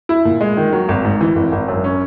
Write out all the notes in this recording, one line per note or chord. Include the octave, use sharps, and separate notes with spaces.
E4
A#2
G#3
D#3
F#3
G#1
G#2
E3
G#1
G#1
F#2
C#4